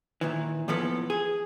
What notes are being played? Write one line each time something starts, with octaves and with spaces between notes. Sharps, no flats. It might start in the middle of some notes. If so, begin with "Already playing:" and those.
A#2 D#3 E3
A2 E3 F3 B3 A4
G#4